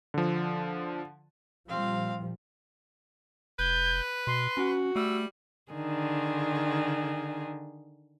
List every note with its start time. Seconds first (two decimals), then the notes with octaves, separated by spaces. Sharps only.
0.14 D3 F3
1.68 A#2 F3 G3 C4 F5
3.59 F1 B4 G6
4.27 B2 C6
4.57 C#4 F#4
4.96 G3 A3 E6
5.71 D3 D#3 G#4